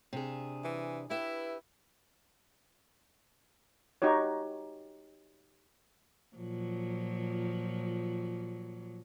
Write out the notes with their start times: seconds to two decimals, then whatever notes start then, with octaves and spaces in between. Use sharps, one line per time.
0.13 C3 D4 G#4
0.64 E3
1.10 E4 G4 B4 E5
4.02 D#4 F#4 G4 C#5
6.37 A#2 F3 F#3